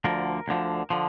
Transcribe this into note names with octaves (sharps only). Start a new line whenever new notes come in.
D2 D3 F3 A#4
D2 D3 F3
D3 F3